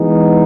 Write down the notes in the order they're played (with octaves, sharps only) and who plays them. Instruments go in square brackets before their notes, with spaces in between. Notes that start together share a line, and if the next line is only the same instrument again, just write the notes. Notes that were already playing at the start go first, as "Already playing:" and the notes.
Already playing: [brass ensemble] E3 G#3 B3 D#4